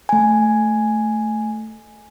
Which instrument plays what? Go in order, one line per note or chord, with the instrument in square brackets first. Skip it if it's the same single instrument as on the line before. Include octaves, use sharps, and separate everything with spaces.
[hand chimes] A3 G#5